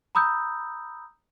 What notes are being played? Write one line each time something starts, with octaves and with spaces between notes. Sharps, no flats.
A#5 B5 D#6 E6 G6